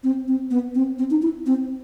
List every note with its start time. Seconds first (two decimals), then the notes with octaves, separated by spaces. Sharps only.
0.04 C4
0.28 C4
0.51 B3
0.75 C4
0.98 C4
1.11 D#4
1.22 E4
1.46 C4